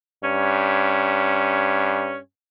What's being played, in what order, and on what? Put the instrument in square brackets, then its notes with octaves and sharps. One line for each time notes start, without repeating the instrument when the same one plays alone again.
[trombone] G2 [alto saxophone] C#4